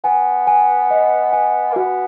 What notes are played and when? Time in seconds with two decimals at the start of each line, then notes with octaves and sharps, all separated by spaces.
0.04 B3 G#5
0.47 G#5
0.91 D#5
1.33 G#5
1.72 A#3
1.76 B3 F#4